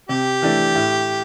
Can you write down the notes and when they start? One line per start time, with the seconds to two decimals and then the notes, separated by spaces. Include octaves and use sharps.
0.09 C3 G4
0.42 E3 A3 D4
0.75 A2